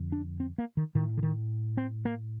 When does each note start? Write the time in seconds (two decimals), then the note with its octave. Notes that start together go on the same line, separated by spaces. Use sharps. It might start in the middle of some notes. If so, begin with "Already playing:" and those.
Already playing: F2 D3
0.12 D4
0.40 C4
0.58 A#3
0.77 D#3
0.95 A2 D#3
1.17 D3
1.23 D#3
1.77 C4
2.05 A#3